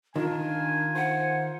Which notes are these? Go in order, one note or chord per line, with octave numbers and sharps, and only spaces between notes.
D#3 D4 F4 A#4 G#5
C5 F#5